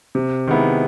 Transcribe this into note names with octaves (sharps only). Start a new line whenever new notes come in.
C3
D#3 G#3 B3 E4